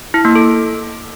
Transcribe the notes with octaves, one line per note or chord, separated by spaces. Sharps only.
E4
A#3
A4